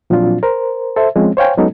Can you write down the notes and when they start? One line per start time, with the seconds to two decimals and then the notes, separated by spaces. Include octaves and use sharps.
0.10 A#2 F3 F#3 C4 D4 F4
0.43 A#4 C5
0.96 A4 C5 E5
1.16 F3 G#3 C4 C#4
1.37 C5 C#5 F5 G5 G#5
1.57 F#3 G#3 B3 C#4 D#4 A4